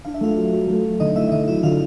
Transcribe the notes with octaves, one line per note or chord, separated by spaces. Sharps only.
D4 F5
E5
A3 F4 F5
F#3
F#3
A3
F#3
D3 D#4 D#5
A3 E4 E5
E5
D3 D#4 D#5
F#3 E4 E5
D3 F4 F5